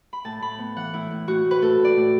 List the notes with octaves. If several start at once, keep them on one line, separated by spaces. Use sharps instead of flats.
B5
A2 A5
A2 B5
B3
E3 F#5
A2 E4
A2
A2 F#4
A2
B4
A2 A4
A2
D5
A2